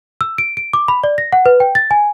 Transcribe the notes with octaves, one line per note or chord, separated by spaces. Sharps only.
E6
D7
D7
D6
B5
D5
A#6
F#5
B4
G5
A6
G#5